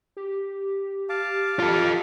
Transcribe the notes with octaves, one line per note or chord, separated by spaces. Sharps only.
G4
F5 A5 D6
F4 A4